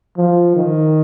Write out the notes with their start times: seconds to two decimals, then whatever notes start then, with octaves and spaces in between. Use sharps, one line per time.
0.17 F3
0.56 D#3